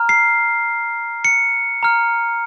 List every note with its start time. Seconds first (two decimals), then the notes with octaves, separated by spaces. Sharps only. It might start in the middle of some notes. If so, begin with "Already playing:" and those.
Already playing: A#5 F6
0.09 C7
1.25 C#7
1.83 A#5 F6